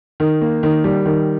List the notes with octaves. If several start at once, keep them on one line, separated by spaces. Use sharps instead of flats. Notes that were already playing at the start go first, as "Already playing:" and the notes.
D#3
A#3
D#3
G3
D#3